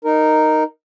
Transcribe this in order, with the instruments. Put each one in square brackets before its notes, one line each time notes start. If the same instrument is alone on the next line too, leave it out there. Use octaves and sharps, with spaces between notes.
[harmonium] D#4 A#4